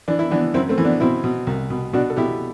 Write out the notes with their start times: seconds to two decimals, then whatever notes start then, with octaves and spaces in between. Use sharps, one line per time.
0.08 E3 D4
0.19 E4
0.31 E3 B3 D4
0.54 F#2 C4 E4
0.69 A3 C4
0.78 E3
0.85 B3 D4
1.00 B2 C4 E4
1.24 B2
1.47 C2
1.70 B2
1.93 B2 D4 F#4
2.10 A4
2.16 B2 E4 G4